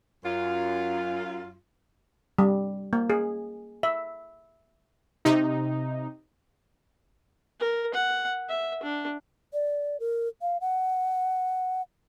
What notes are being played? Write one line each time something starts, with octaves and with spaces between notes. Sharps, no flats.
F#2 F4
G3
A#3
G#4
E5
C3 D#4
A#4
F#5
E5
D4
D5
A#4
F5
F#5